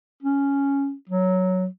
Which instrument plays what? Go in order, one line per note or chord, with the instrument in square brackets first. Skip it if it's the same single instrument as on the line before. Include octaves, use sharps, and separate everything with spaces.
[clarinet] C#4
F#3